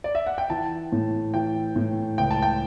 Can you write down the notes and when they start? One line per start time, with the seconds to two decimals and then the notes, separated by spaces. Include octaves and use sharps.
0.04 D5
0.15 E5
0.26 F#5
0.38 G5
0.50 E3 A5
0.92 A2
1.34 E3 G5
1.76 A2
2.18 C#2 G5
2.31 A5
2.42 G5